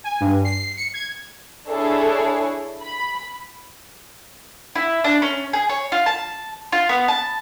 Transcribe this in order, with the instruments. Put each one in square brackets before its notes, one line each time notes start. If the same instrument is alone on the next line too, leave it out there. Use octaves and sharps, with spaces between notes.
[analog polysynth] G#5
G2
C7
C#7
G#6
[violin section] D4 E4 G#4 A4 C#5
B5
[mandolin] E4
D4
C#4
G#4
C#5
F4
A5
F4
B3
A5